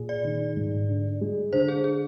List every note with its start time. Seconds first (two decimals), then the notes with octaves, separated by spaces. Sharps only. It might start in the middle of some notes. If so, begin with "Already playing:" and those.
Already playing: A#2 G#4
0.09 D5
0.24 D#3
0.57 G#2
0.88 D3
1.21 G#3
1.53 D3 C5
1.68 G#4
1.84 G#4